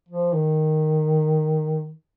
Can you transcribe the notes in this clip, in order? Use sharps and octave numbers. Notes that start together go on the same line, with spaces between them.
F3
D#3